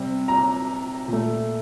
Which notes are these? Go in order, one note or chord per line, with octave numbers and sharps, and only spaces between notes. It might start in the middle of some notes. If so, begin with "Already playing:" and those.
Already playing: C3 G3
A#5
A#2
A3